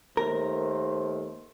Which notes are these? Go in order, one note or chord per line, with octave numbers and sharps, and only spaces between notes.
D#2 A3 A#4 C5